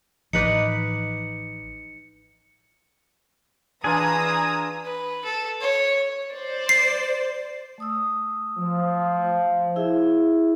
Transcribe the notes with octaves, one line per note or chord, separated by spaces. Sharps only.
A1 F3 D#4 B4 D5 C#7
E3 D4 F4 G#4 A#5 D#6 E6
B4
A4
C#5
C5 D5
C7
A3 D#6 E6
F3
E4 G#4 E5